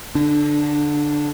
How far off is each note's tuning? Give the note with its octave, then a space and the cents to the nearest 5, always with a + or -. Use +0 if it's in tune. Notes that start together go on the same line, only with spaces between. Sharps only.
D3 -15 D4 +15